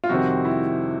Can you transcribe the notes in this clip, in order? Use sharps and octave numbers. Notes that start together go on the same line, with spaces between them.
F4
F2 C3 D#3 G3 C4 F#4
E4